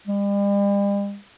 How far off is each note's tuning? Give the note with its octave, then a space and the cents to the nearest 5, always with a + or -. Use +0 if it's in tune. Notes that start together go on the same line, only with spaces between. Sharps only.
G3 +45